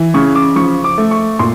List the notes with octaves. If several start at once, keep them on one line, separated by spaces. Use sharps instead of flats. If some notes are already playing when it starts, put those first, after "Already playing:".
Already playing: E3
C#3 C#6
D6
F3 C#6
D6
A3
C#6
A#2 C6